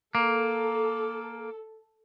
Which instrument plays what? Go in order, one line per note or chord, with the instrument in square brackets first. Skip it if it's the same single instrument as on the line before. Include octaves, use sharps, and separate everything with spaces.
[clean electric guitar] A#3 [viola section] A4